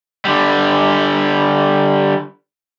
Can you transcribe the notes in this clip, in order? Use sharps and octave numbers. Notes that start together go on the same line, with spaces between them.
D3 G3